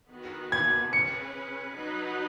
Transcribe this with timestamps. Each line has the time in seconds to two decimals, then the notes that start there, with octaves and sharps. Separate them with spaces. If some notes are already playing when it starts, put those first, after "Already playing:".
0.11 D#3 B3 F#4 B4
0.52 G#6
0.93 C#4 G#4 B4 C#7
1.75 F#3 D#4 F#4 B4